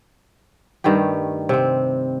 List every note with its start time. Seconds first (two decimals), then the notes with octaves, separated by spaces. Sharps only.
0.84 G2 D#3 A3 G4
1.49 C3 C4